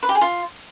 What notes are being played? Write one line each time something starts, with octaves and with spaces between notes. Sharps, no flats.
B4
G4
G#4
F4